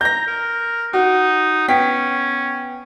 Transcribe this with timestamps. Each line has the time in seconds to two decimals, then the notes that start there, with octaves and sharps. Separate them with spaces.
0.01 A#5 G6 A#6
0.27 A#4
0.93 D#4 F#4
1.68 B3 C#4 G5 B6